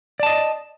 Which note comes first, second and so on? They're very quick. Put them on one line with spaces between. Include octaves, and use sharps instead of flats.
D5 A5 D#5